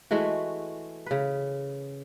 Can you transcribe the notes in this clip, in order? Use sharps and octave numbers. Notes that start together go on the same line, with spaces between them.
E3 G#3 A3 F#4
C#3 B4